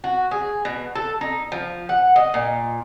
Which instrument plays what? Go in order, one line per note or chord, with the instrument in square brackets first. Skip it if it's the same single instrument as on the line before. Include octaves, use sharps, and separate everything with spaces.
[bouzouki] F#4
G#4
B2
A4
D#4
F3
F#5
D#5
A#2